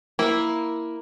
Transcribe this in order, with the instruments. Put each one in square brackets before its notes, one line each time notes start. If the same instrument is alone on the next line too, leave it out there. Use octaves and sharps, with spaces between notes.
[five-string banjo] A#3 E4